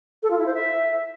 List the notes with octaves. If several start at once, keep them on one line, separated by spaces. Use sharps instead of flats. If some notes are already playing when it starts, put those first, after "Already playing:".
A4
F4
E4
C5
E5